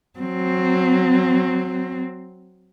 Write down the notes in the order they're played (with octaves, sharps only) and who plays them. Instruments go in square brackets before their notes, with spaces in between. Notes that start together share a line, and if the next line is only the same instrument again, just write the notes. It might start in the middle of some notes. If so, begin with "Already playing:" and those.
[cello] F#3 C4